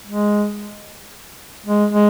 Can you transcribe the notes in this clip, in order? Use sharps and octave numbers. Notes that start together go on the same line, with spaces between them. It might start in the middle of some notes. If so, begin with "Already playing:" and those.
G#3
G#3
G#3